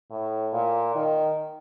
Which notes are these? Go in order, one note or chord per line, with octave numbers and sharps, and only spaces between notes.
A2
A#2
D#3